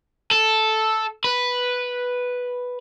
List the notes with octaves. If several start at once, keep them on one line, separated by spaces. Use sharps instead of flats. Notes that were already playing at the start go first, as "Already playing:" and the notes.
A4
B4